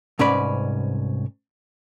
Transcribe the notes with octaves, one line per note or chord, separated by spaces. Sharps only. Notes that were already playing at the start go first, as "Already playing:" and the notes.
C2 G#2 C#4 B4 D5 B5